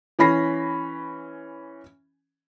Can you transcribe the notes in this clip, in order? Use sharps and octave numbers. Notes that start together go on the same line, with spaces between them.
E3 C#4 B5 A#6 C7